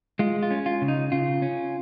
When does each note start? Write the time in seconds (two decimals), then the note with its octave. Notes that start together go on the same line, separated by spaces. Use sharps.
0.19 G#3 F4
0.43 F4
0.51 C#4
0.66 F4
0.82 C#3
0.88 D#4
1.12 C#3 F4
1.42 C#4